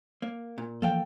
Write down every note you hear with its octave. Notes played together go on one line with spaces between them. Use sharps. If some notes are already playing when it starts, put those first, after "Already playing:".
A#3
A#2
E3 F3 A#3 A4 F5 G5